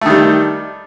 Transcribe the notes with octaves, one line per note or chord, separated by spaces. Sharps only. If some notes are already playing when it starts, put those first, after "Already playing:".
D#3 G3 A3